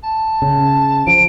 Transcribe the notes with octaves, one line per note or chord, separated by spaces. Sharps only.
A5
C#3
F3 D7